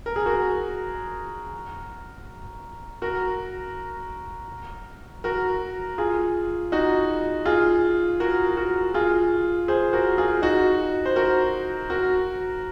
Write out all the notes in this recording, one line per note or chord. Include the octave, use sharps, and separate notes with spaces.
A#4
G#4
F#4 A#4
F#4 A#4
F#4 A#4
F4 G#4
D#4 F#4
F4 G#4
F#4 A#4
F#4 A#4
F4 G#4
G#4 C5
F#4 A#4
F4 G#4
D#4 F#4
C5
F#4 A#4
F#4 A#4